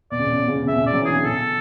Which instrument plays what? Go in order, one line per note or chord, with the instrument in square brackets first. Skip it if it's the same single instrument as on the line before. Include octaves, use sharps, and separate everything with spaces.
[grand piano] B2 [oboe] D5
[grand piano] C#3
B2
C#3
B2
C#3
B2
C#3
[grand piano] B2 [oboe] E5
[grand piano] C#3
[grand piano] B2 [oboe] D5
[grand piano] F#3
E3
[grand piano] D3 [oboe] G#4
[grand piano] C#3
[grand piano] B2 [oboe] A4